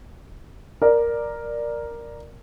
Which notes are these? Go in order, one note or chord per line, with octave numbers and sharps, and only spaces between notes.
A#4 D5